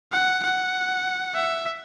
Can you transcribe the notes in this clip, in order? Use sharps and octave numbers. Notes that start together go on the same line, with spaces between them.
F#5
F#5
E5